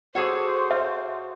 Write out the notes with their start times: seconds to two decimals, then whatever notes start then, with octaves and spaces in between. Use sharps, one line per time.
0.15 F#4 G#4 A4 C5 C#5 D6
0.71 E5